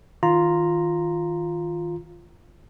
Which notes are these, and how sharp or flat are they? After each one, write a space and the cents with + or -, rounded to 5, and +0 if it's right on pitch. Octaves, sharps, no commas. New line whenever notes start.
D#3 +25 F4 +0 A#5 +0